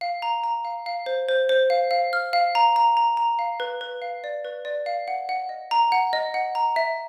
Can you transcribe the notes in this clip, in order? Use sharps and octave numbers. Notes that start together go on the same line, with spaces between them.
F5
A#5
A#5
F5
F5
C5
C5
C5
F5
F5
F6
F5
A#5
A#5
A#5
A#5
F5
B4
B4
F5
D5
B4
D5
F5
F#5
F#5
D#5
A#5
F#5
D#5
F#5
A#5
E5